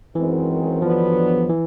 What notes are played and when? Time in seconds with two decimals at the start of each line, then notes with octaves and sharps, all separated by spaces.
0.15 F#2 D#3 E3 G#3 C4
0.82 G2 D3 F3 F#3 B3
1.49 E3